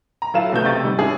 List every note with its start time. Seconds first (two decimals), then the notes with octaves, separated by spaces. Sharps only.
0.22 A#5
0.34 F#3 E4 F4 A4 F5 E7
0.52 A#1 B2 A3 B3 G6
0.65 C3 D#5 C#6 A6
0.84 G#2 G3
0.99 C#4 D4 E4 G#4